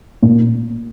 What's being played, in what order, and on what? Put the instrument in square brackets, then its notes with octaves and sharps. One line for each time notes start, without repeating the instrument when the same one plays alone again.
[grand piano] A#2